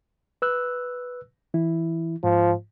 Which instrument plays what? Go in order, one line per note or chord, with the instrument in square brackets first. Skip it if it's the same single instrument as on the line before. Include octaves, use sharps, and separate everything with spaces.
[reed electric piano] B4 E6 F#6
E3 E4
[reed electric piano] G#2 [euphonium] F3